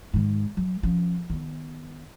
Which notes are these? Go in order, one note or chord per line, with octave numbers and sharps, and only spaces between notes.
G#2 D#3
F#3
F3 C#4
D#3 B3